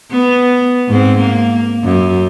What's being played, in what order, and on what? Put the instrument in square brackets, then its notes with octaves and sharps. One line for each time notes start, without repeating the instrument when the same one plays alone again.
[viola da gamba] B3
G#2 C4
A#3
F#2